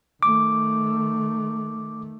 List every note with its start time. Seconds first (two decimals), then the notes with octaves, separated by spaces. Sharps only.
0.23 D#3 A3 D6